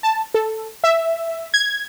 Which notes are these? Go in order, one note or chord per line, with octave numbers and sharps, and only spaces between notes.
A5
A4
E5
G#6